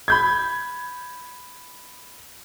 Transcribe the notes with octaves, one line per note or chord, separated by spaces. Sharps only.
B5 G6 G#6